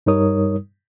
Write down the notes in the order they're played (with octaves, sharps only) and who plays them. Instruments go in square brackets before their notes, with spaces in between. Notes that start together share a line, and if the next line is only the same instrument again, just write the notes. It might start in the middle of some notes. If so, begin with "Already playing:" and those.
[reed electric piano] G2 G3 D#4 A#4 C#5 D#6